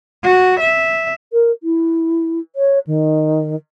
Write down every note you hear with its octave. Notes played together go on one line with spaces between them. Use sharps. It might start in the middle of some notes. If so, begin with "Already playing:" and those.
F#4
E5
A#4
E4
C#5
D#3